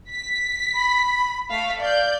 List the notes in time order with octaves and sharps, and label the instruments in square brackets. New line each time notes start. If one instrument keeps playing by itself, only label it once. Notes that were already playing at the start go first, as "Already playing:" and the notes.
[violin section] B6
[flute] B5
[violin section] A3 F5 B6
[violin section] D5 G6 [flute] F5